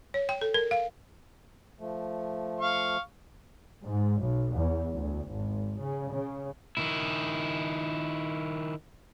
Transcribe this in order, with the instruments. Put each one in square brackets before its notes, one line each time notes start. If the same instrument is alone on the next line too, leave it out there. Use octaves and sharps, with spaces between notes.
[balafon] C#5
G5
A4
A#4
F5
[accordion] F3 A3
[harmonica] F5 C#6
[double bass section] G#2
B1
E2
D2
G#1
C#3
C#3
[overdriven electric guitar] D#3 E4